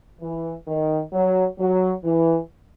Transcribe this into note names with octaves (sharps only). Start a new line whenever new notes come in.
E3
D#3
F#3
F#3
E3